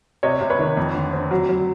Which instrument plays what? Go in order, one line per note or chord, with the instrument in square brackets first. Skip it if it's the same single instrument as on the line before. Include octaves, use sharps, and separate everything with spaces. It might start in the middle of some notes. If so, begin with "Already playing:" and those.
[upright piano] C3 C#5 D#5
C3
B4 C#5
D#3
F2
D3
C4
F#3
F#3